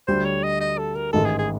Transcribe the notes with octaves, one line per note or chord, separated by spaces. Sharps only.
D2 D3 G3 C5
C#5
D#5
D#5
A4
A#4
A1 G#2 D#3 G#3 A4
G#4
G#4